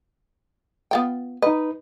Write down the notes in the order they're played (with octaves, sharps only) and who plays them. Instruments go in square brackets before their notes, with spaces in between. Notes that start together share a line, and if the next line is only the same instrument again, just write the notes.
[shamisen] B3 F4 G5
[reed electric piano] D#4 B4 [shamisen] D#5